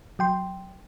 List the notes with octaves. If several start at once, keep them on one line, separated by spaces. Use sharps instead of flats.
F#3 G5 C6